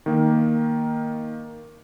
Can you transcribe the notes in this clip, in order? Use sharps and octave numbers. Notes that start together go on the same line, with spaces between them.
D#3 A#3